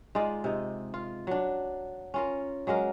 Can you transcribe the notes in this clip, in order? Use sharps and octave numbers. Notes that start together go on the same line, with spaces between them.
G#3 D#4 F4 D5
C3 D#4
F4
F#3 D4
C#4 F4 A#4
F#3 G#3 A#3 A#4